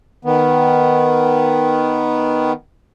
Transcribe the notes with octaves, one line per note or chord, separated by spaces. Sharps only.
D#3 B3